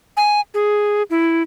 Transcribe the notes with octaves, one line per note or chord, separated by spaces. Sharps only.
G#5
G#4
E4